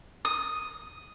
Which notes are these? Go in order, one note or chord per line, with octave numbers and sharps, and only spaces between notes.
D#6